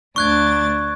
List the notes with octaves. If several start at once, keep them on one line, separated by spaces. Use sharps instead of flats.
D2 D4 C#6 F#6 G#6 A6